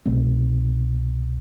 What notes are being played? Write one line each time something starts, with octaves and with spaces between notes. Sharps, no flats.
C2 B2 A3 C4